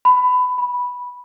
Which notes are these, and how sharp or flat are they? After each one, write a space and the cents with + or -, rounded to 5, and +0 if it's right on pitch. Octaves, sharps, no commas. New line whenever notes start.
B5 +20
B5 -5